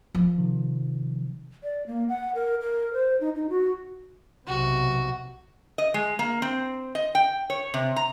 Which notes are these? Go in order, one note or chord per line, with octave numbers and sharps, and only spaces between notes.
F3
C3 D#3
D5
A#3
F#5
A#4
A#4
C5
D#4
D#4
F#4
B1 C3 F#4
D#5
G#3
A#3
C4
D#5
G5
C#5
C3
A#5